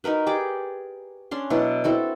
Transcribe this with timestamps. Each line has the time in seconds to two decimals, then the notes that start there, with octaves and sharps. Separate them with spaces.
0.04 D#4 F#4 A#4 B4
0.27 G4 G#4 D5 D6
1.31 C#4 D4 C6
1.50 B2 F#3 D4 E4
1.84 C4 E4 F#4 A4